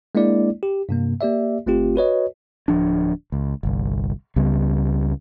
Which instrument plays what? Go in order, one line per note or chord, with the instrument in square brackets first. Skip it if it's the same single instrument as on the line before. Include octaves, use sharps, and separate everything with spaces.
[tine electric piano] G#3 A#3 D4 E4 D5
G4
G2 C3 A#3
A#3 G4 D5 E5
G1 A3 C4 F4 G4
F#4 B4 C#5 D#5
[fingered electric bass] D1 F3 D4
C#2
G1 C2
C#2 C#3 G3 B3